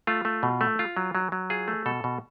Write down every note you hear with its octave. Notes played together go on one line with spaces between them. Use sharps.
A3 F4
A3
B2
A3
F4
F#3
F#3
F#3
F4 G#4
A3
B2 A4
B2